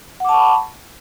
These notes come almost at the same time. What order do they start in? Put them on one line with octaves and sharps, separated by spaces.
F#5 D6 A5 C#6 B5